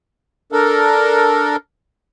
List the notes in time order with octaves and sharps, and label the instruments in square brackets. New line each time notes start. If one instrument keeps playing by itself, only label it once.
[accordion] D4 A4 A#4